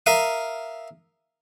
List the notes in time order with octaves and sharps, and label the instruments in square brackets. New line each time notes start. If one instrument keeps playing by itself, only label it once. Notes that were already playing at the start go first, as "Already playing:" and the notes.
[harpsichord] A#4 E5 F5 D#6